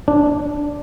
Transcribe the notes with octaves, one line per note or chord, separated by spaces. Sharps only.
D4